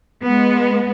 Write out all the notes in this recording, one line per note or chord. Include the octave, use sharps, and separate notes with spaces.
G#3 B3